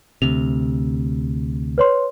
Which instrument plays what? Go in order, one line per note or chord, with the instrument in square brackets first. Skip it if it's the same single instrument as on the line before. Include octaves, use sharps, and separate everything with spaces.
[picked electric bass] D2 C3 [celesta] F7
[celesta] B4 C#5 C6